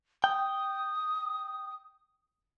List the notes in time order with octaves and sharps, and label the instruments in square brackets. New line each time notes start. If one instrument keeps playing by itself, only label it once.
[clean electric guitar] G5 [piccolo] D#6